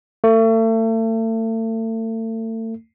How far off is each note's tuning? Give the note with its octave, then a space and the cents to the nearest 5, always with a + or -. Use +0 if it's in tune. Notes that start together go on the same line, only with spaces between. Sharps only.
A3 +35